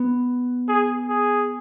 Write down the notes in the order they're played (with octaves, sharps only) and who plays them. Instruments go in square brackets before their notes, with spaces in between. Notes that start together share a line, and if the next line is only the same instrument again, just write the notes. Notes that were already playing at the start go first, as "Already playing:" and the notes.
Already playing: [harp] B3
[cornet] G#4
G#4